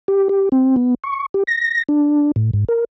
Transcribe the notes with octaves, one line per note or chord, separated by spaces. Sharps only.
G4
G4
C4
B3
C#6
G4
A#6
D4
A2
G#2
A#4